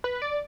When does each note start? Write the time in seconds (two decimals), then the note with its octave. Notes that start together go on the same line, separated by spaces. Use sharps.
0.04 B4
0.22 D5